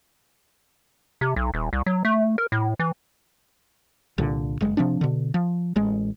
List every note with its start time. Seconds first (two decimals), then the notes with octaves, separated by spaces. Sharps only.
1.21 C3
1.36 B1
1.54 D#1
1.73 C2
1.86 F#3
2.05 A3
2.38 A#4
2.52 A2
2.79 E3
4.18 C2 A#2 D3
4.61 F#1 G#3
4.77 C3 F3 C4 D4
5.01 B2 D3
5.34 F3
5.76 A1 G#3